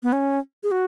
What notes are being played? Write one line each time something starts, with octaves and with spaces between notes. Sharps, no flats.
B3
C#4
G#4
F#4